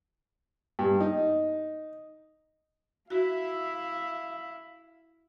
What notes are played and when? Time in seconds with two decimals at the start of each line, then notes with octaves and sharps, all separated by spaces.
0.79 G2
1.00 D#4
3.10 E4 F#4 E5 F5